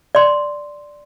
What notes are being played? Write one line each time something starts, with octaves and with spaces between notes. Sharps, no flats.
D5 C6